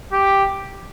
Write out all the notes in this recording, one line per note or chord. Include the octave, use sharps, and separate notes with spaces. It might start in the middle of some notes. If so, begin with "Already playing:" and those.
G4